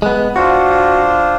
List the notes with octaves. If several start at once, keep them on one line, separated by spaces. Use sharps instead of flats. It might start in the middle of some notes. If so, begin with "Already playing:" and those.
G#3 B3 F#6
D4 F4 F#4 C5